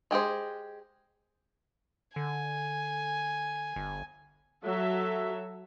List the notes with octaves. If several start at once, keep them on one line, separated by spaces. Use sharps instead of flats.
G#3 G4 G#4 C5
D3 G#5
G1
F#3 A4 E5